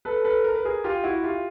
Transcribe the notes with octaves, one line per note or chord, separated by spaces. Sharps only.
A4 B4
A4 B4
A#4
B4
G#4 A#4
F4 G4
E4 F#4
F4 G4